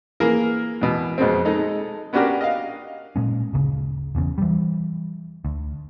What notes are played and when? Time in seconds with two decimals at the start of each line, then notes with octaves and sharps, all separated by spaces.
0.20 E3 A#3 G#4 A#4
0.82 E2 B2
1.18 F2 B2 G#3 C4
1.45 G#3 D#4 A4
2.13 B3 C#4 D4 F#4 G4 A#4
2.41 D#5 F5
3.16 A#2 G#3 C#4
3.53 D1 G1 C#3
4.15 E1 E2 C#3
4.38 E3 G3
5.45 D2